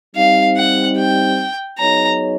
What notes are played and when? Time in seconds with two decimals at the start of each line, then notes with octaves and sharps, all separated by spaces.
0.16 G3 C4 D#4 F5
0.57 F#5
0.97 G5
1.79 F#3 B3 D#4 G#4 C#5 A#5